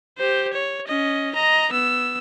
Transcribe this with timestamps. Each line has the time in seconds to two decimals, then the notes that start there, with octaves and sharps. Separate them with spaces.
0.18 G4 C5
0.53 C#5
0.88 C#4 D#5
1.35 D#5 A#5
1.72 B3 E6